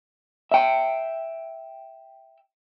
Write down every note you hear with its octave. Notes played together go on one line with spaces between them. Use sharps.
E5 G5